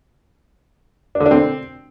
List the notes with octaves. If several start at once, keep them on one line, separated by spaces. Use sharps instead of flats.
D4
D3
D4
C4